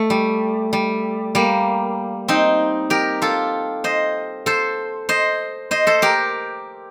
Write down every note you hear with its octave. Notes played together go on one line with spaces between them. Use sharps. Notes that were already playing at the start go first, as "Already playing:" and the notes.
Already playing: A3
G3
G3
G3 A#3
C4 D#4
G4 A#4
F4 A4
C5 D#5
A4 C5
C5 D#5
C5 D#5
A4 C5
G4 A#4